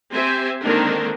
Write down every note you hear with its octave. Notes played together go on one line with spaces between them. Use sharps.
C4 G4 C5 E5 G#5
D3 D#3 G#3 A#3 C4 D4